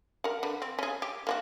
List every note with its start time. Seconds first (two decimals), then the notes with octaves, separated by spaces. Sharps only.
0.24 A#4 F#5
0.43 D3 B4
0.62 C4
0.79 C#4 G#4
1.02 G4
1.27 A#3 E4 F#4